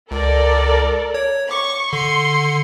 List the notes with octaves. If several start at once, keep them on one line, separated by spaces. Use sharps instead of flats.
C#2 A4 A#4 D5
C#5
C#6 D6
D3 C6 C#7